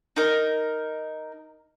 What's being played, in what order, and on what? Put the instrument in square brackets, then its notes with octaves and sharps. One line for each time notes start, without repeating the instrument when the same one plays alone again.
[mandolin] D#4 A#4